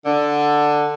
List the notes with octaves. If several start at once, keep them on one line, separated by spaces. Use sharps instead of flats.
D3